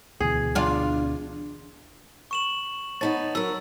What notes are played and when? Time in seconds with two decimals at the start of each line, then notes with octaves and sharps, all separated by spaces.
0.20 D2 B2 E3 G#4
0.55 D4 F4
2.31 C#6 E7 F#7
3.01 B3 D#4 C#5 A5 A6
3.35 F#3 A#4 E6